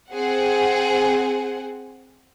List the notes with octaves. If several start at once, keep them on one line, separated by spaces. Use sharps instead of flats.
C4 G#4 F#5